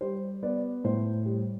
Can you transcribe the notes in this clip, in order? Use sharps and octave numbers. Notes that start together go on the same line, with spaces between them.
G3 C5
B3 D5
A2 C5
G3